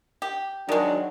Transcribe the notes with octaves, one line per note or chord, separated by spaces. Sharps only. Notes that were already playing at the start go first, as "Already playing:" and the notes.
G4
D#3 F#3 G#3 D4